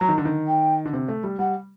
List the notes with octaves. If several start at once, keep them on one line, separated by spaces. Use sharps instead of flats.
F#3 A#5
D#3
D3
D#3
G5
D3
C3
A3
G3
G3 F#5